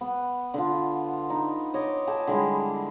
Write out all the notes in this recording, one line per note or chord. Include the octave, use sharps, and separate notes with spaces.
B3
D3 F4
D#4
C#5 D#5 D6
G4 A4 G#5 A5
D3 G3 G#3 E4